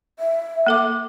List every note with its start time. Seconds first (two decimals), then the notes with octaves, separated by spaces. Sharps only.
0.19 E5
0.67 A#3 A4 D6